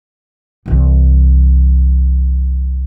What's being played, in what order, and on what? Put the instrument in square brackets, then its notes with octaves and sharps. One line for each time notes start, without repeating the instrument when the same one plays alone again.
[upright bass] C2 E3